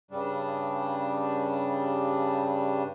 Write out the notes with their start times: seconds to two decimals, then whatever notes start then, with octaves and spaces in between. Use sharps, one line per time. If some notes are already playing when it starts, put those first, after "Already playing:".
0.11 G2 C#3 G3 D4